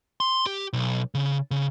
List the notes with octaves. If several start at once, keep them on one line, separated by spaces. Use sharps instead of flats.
C6
G4
B1
C#3
C#3